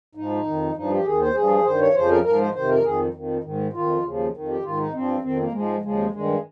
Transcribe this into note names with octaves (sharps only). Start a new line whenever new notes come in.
G#2 F3 D#4
F2 D#3
G2 F3 D#4
G4
D#2 D#3 G#4
C5
G2 F3 G#4
G2 D#3 C5
C#5
F2 C#3 F3 C5
A#4
G#2 F3 A#4
C5
F2 C3 D#3 C5
A#4
F2 D#3 G#4
F2 D#3
G#2 D#3
F2 D#3 F4
D#2 C#3 F3
F2 D#3
G4
G#2 D#3 F4
D#4
G2 F3 C4
F2 D#3 C4
A#3
G#2 F3 G#3
D#2 C#3 F3 G#3
G2 D#3 G#3